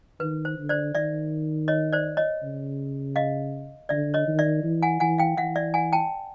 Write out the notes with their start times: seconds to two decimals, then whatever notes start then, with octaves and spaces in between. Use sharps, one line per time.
0.20 D#3 B4
0.45 C5
0.58 D3
0.69 C5 D5
0.95 D#3 D5 E5
1.68 C#5 D#5
1.93 C5 D5
2.17 C#5 D#5
2.42 C#3
3.16 D#5 F5
3.89 D3 D5 E5
4.14 C#5 D#5
4.27 D#3
4.39 D5 E5
4.63 E3
4.82 F#5 G#5
5.00 E3 F#5 G#5
5.18 F5 G5
5.37 E3 E5 F#5
5.56 D5 E5
5.74 F#5 G#5
5.93 G5 A5